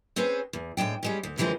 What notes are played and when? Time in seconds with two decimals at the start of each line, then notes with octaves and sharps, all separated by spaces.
0.16 C4 C#4 G#4 B4 C5
0.53 E2
0.77 A2 G#3 D4 G5
1.03 G3 G#3 C#4
1.23 D2
1.37 F#2 D3 E3 F3 G#3 C4